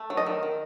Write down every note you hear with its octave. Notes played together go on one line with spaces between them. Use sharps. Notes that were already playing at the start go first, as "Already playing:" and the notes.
Already playing: A3
F#3
D#5
D#3
D#3